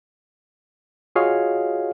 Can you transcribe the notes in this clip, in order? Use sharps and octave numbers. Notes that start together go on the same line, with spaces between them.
F4 F#4 G#4 C#5 D#5 F5